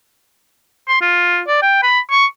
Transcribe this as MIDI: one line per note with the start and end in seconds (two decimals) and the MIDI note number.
0.89 0.97 84
1.01 1.41 65
1.48 1.58 74
1.62 1.79 79
1.83 2.00 83
2.11 2.26 85